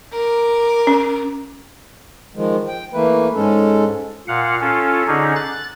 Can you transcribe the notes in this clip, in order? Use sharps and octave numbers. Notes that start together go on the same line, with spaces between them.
A#4 D6
C#4
D#3 F3 G#3
G5
E3 A3 A#3 B4
G#2 G#3 C#4 A4
A#2 F5 F#5
C#4 F4 A4
D3 C#4 D#4 G#4
F#6 A6